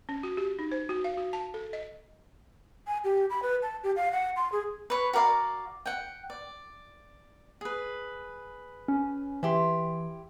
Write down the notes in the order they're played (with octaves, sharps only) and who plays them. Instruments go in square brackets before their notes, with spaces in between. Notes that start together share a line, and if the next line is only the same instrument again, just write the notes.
[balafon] C#4
F#4
G4
D#4
C5
F#4
F5
F#4
A5
A4
D#5
[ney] G#5
G4
B5
B4
A5
G4
F5
F#5
C6
G#4
[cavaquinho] B4 C#5
F#4 A#4 D5 F5
F#5 G5
D5
G#4 B4
[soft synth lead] C#4
[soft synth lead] E3 [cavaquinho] E4 G4 C6